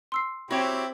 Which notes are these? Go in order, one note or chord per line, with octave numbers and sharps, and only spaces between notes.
C6 E6 C7
C4 E4 F#4 G4 C#5 G5